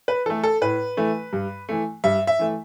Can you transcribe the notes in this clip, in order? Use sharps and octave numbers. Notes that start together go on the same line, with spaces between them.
B4
E3 A3 A4
A4
A2 B4
E3 A3
G2
E3 A3
G2 E5
E5
E3 A3